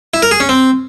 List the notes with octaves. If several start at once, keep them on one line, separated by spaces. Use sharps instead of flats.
E4
A#4
G#4
C#4
C4